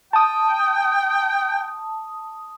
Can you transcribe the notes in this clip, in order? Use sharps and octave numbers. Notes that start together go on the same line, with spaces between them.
G5 A5 D#6